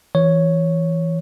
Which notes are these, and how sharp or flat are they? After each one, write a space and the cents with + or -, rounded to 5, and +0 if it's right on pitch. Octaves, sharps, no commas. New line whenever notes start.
E3 +0 C#5 +0